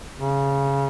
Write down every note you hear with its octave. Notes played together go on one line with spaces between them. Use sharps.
C#3